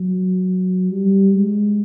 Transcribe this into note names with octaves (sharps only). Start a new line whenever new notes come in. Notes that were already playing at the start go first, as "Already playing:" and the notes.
Already playing: F#3
G3
G#3